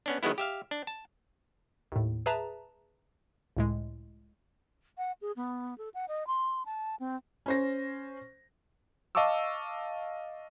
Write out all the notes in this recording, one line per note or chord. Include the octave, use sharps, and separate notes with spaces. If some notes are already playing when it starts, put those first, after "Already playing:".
B3 C#4 D4
D#3 F#3 G#3 B3 E4
G4 E5 F5
D4
A5
D#2 A2
G#4 B4 E5 A5 A#5
C#2 A2 G#3
F#5
G#4
B3
A4
F#5
D#5
C6
A5
C4
C#4 C5 A#6
D#5 F5 A5 C#6 D6 E6